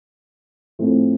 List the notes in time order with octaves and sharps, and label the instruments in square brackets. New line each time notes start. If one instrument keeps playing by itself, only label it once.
[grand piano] A2 F3 A3 C4